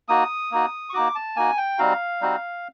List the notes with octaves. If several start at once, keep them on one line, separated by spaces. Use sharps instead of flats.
A#3 D#4 F#4 D#6
A#3 D#4 F#4
C#6
A#3 D#4 F#4 D6
A5
A#3 D#4 F#4 G#5
G5
G3 C4 D#4 F#4 F5
G3 C4 D#4 F#4